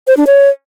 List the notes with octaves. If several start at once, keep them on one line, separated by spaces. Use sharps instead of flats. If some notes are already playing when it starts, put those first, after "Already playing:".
C5
D4
C#5